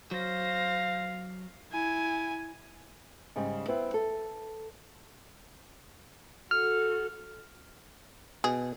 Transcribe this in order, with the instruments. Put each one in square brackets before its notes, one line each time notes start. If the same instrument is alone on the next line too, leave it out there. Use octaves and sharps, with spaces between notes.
[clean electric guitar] F#3 [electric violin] C5 A#6 [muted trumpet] F5
[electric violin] E4 G#5
[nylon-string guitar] G#2 C#3 G3
B3 C4 E4 B4
A4
[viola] F#4 A4 [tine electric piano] F6
[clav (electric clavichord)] B2 [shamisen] G#4